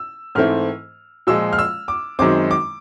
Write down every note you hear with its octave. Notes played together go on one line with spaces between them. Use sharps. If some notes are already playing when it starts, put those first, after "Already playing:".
Already playing: E6
G#2 E3 A3 C4 F6
A#2 F3 G#3 E6
F6
E6
D6
F#2 D#3 G#3 C4 D6
D6